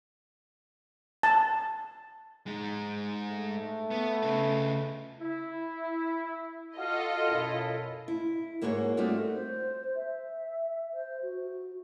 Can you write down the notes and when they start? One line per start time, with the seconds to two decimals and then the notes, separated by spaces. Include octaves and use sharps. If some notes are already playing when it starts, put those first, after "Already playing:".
1.23 A5
2.46 G#3 D#4
3.30 A3
3.91 B3
4.23 C#3 B4
5.20 E4
6.78 F4 F#4 A4 D#5 F5
7.28 F#2 B2 E4
8.08 E4
8.61 G#2 A#3 F#4 G#4 A#4 C#5
8.97 G3 A3 C4 D#4 F4 F#4
9.32 C5
9.95 E5
10.92 C5
11.22 F#4